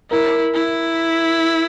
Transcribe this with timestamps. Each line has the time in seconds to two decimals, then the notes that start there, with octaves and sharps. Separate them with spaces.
0.11 E4 A#4
0.54 E4